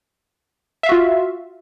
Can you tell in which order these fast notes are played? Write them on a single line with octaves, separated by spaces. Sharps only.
E5 F5 F#4 F4